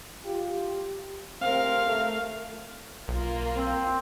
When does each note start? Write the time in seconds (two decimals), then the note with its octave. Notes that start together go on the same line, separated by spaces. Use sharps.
0.25 F4 G4
1.42 C3 A3 C4 A#4 F5
1.87 A3
3.08 B1 A#3 F4
3.56 C4